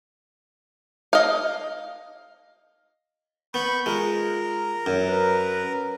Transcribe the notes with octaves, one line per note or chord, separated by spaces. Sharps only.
D#5 F5
B3 B5 C#6 G6
G#3 F4 A#4
F#2
B4